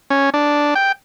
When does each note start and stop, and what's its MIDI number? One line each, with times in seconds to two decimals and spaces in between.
0.10 0.30 61
0.34 0.74 62
0.75 0.92 79